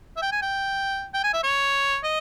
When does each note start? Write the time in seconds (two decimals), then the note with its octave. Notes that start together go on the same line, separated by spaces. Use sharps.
0.16 E5
0.22 G5
0.32 G#5
0.42 G5
1.14 G5
1.24 G#5
1.33 E5
1.43 C#5
2.04 D#5